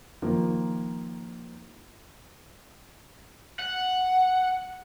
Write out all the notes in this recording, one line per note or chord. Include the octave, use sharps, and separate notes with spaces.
D#3 F3 A#3
F#5